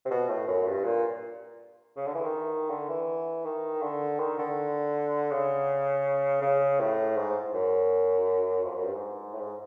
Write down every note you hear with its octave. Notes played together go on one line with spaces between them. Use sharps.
C3
B2
A2
F#2
G2
A#2
C#3
D3
E3
D#3
D3
E3
D#3
D3
D#3
D3
C#3
C#3
A2
G#2
F#2
F2
F#2
G2
G#2
A2
G#2